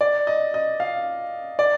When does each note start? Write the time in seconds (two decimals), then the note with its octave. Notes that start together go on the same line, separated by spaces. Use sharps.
0.01 D5
0.27 D#5
0.54 D#5
0.80 F5
1.59 D5